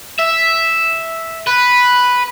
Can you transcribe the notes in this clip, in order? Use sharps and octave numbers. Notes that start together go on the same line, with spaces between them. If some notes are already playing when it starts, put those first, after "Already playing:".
E5
B4